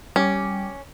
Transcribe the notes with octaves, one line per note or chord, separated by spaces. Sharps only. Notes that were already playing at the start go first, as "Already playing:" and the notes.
G3 C#4 G5 D6